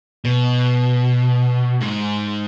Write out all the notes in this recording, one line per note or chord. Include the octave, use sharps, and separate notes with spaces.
B2
G#2